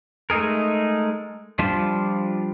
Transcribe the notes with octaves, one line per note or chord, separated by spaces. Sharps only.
G#3 A3 D#4 G#4 A#4
F3 G3 D4 F4 A5